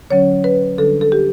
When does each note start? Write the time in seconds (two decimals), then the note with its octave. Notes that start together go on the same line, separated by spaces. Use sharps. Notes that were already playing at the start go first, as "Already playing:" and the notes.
0.10 D3 F#3 C#4 C#5
0.44 B4
0.78 D3 G3 D4 A4
1.01 A4
1.12 G4